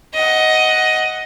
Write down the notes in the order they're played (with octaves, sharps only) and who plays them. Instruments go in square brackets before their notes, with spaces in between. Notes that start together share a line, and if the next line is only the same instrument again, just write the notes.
[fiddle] D#5 F#5